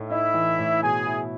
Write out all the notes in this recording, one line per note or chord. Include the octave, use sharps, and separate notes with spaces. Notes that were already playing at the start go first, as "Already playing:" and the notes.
Already playing: A2 A3 D#4
D#4 E4 E5
E3
A2
B2 G#4 G#5
E4